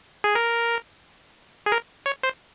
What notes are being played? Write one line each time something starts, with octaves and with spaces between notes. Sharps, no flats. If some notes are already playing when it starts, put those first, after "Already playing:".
G#4
A#4
G#4
A#4
C#5
C5